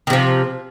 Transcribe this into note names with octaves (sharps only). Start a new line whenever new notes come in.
C3 D#3 F3